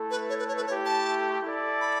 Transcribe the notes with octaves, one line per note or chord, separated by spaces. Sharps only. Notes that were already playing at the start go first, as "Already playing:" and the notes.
Already playing: A3 E4 A4
B4
C#5
B4
C#5
B4
A3 E4 G4 C#5
A5
E4 A4 D5
B5